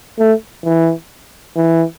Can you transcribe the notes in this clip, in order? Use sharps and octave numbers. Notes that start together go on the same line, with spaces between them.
A3
E3
E3